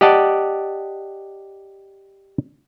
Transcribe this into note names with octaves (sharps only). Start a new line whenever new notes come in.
G4 D5 D#5 F#5 A5